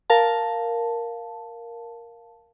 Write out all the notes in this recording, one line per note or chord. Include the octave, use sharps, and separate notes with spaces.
A#4 F5 A5